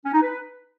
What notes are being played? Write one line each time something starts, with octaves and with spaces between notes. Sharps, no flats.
C#4
D#4
B4